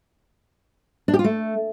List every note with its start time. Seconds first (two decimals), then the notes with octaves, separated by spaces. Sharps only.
1.08 D4
1.14 G4
1.19 F4
1.24 A3